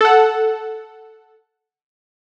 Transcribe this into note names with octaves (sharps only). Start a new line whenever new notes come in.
A4 F#5